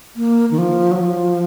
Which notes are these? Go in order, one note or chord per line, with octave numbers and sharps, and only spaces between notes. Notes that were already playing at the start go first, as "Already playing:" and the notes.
A#3
D#3
F3
F#3
F3